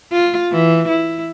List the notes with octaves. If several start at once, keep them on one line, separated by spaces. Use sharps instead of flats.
F4
E3
E4